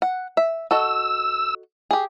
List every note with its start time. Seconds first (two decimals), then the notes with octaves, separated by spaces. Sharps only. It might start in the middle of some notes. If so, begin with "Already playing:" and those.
0.02 F#5
0.37 E5
0.71 F#4 A4 D#5 E6
1.91 G4 G#4